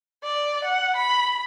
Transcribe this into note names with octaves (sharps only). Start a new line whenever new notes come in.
D5
F#5
B5